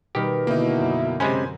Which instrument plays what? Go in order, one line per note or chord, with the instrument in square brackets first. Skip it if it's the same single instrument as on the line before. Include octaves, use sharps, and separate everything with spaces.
[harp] B2 G3 B5 [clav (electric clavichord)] D#3 G4 [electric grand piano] A#4
[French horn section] B2 E4 [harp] D3 [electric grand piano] A#3 D#4
[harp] F#2
[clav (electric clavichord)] C3 G#3 C#4 [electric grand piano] C5 G#5 B5